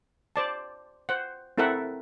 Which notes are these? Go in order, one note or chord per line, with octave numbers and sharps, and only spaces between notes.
C5 D5 A5
C5 F#5
C4 E4 A4 A#4 E5 F#5